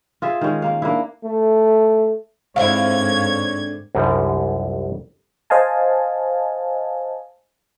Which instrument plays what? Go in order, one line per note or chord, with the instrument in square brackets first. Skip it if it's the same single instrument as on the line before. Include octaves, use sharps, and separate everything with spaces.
[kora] F4 G#4 E5
D#3 G#3 C#4
A#3 F5
A#3 D4 E4
[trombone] A3
[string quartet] G#2 G#6 [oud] D3 C4 E4 [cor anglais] C#5 [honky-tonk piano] F5
[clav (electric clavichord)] C2 F#2 D3 F3 G3
[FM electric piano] C5 D#5 F5 G#5 A5